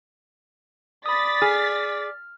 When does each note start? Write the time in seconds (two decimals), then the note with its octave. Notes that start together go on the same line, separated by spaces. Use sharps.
1.06 D5 B5 D#6 A6 B6
1.42 G#4 F6